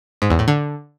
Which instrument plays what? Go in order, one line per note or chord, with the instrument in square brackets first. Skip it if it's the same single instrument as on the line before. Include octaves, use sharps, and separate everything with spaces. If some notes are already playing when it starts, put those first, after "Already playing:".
[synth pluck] G#2
E2
A2
D3